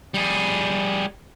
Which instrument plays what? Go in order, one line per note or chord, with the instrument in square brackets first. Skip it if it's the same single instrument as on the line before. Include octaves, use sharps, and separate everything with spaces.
[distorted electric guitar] G3 G#4